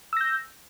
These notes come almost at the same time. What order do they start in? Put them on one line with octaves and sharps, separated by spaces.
E6 A#6 G6